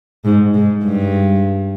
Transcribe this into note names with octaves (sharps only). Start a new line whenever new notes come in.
G#2
G#2
G2